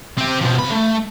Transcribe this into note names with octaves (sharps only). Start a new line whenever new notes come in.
C4 G4
B2 F3
C2 B5
A3